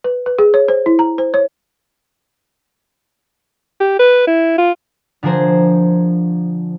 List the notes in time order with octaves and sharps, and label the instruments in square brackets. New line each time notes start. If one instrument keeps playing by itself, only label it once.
[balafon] B4
B4
G#4
C#5
C5
E4
A#5
C5
C#5
[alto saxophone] G4
B4
E4
F4
[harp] D3 F3 G#4 A#4 C5